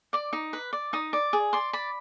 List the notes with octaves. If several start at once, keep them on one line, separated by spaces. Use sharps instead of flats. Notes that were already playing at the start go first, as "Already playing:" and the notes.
D5 D6
D#4
B4
D5
D#4 D#6
D5
G#4
D5 C6
D5 B5